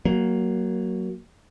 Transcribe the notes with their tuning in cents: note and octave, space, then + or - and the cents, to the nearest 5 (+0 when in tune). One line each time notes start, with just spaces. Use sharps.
F#3 +10 A#3 +0